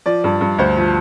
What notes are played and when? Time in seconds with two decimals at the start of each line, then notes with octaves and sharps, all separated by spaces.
0.06 F3 D5
0.24 G2
0.41 G2
0.58 D2 C5
0.77 F3